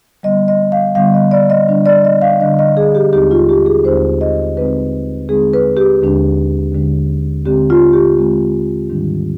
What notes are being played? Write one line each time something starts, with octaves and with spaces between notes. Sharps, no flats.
D3 G3 B3 D#5
D#5
F5
D3 G3 B3 F5
D#5
D5
D#5
D3 G3 D4
D5
D#5
F5
D3 G3 D4 D#5
D#5
G#4
G4
D#2 D3 G#3 C4 D#4 G4
F4
G4
G#4
D#2 D3 G#3 C4 D#4 C5
D#5
D3 G#3 C4 D#4 B4
D3 G#3 C4 D#4 G#4
B4
G4
D#2 D3 G#3 D4
D#2 D3 G#3 D4
D3 G#3 C4 G4
F4
G4
D3 G#3 C4
G#2 D#3 G3 D4